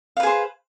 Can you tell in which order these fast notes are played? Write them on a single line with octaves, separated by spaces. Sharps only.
F5 B4 G#4 C5